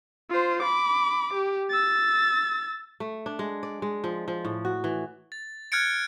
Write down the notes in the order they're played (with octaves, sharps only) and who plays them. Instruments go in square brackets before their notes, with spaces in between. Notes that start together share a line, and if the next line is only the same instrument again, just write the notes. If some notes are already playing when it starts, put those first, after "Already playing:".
[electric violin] F4 C5
B5 D6
G4
E6 A6
[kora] A3
D4
G#3
D5
G#3
F3
F3
A2
F#4
E3
[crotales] A6
F6 F#6 G#6 A6 C#7 D7